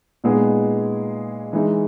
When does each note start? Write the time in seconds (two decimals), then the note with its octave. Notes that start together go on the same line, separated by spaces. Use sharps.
0.24 A#2 G#3 B3 D#4 G#4
1.53 E3 G#3 D#4